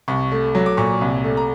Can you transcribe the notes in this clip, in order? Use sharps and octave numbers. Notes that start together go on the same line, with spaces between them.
C2 C#6
A3
F#3
D6
A#2 C#6
C2
A3
A#5